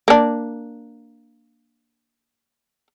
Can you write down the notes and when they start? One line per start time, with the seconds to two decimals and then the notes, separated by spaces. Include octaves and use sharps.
0.08 A#3 D4